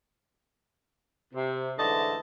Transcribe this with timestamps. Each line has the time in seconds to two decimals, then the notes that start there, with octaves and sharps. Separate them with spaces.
1.33 C3
1.77 G#2 D3 E3 A3 D#5 A5